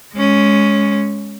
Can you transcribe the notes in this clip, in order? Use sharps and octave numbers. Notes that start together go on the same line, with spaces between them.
G#3 C#4